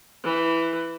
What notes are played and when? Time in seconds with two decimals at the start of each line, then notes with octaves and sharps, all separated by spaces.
0.23 E3